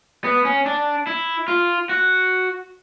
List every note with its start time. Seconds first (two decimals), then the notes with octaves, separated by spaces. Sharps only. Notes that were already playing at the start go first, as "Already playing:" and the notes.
0.24 B3
0.45 C#4
0.66 D4
1.07 E4
1.48 F4
1.89 F#4